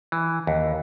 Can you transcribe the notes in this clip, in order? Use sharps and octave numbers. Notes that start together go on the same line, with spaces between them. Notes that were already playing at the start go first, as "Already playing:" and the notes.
E3
D#2